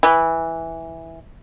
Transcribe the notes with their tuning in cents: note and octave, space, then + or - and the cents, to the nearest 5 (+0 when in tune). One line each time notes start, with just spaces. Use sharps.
E3 -5